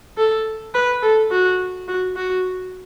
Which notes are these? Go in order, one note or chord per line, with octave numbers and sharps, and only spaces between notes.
A4
B4
A4
F#4
F#4
F#4